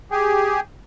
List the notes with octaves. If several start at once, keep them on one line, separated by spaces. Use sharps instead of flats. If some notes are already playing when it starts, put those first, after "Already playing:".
G4 G#4